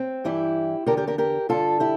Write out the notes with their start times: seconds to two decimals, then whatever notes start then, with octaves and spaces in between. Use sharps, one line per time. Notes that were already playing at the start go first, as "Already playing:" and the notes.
Already playing: C4
0.24 G2 E3 E4 G4
0.86 E2 D3 G4 A#4
0.97 G4 A#4
1.07 G4 A#4
1.18 G4 A#4
1.49 G2 D3 F4 A4
1.80 E4 G4